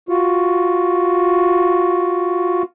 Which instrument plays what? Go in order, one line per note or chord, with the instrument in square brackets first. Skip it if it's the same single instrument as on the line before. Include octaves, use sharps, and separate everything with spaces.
[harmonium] F4 F#4